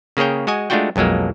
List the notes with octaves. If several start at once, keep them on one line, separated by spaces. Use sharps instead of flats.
C#3 A#3 G#4 C#5 G5
G#3 F#4 D#5 G#5
G#3 A3 D4 F4 F#4 G5
B1 F2 F#3 G#3 A#3